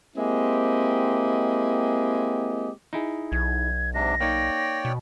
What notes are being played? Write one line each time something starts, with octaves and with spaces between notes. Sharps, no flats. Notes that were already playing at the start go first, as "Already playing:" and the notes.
G#3 A#3 C4 E4 G4 D#5
D#4 E4 G#4
B1 G#6
G#2 C3 D4 A#6
A#3 D#4 C#5 D5 G5
B2